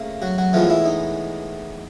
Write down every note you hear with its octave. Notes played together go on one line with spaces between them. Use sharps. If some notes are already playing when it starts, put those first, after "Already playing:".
Already playing: C#3 A3 A#3
F#3 F#4
F#3 F#4
A2 E3 F3 G#3 B3 F4
E4
D#4